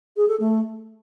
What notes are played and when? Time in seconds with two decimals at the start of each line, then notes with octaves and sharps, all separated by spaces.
0.17 G#4
0.28 A4
0.40 A3